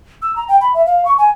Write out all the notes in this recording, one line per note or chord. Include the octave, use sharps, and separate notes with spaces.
E6
A#5
G5
B5
E5
F5
C#6
G#5